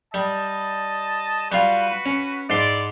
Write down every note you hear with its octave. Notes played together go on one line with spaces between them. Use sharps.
G3 D#5 A5
G3 F4 F#4 B4
C#4
G#2 E4 D5 C6